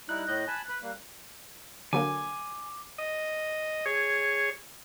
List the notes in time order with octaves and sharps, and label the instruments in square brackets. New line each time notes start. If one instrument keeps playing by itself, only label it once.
[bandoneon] G3 D#4 E4 [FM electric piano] F#6
[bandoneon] A2 D#5 G6
G#5 A5 B5
B4 B5
G3 A#3
[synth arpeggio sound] D3 F#3 A#3 [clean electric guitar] G#5 [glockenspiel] D6
[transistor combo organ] D#5
G#4 C#5